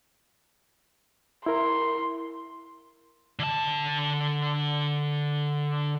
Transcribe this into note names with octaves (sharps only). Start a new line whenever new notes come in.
E4 A#4 C6
D3 A5